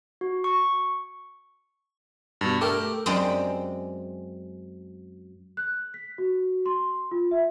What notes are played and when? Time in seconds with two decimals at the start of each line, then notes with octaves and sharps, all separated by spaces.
0.21 F#4
0.44 C#6
2.41 G2 B2
2.61 A3 G4 A#4 D6
3.06 F#2 G#3 C4 G4 D5
5.57 F#6
5.94 B6
6.18 F#4
6.66 C6
7.11 F4
7.31 E5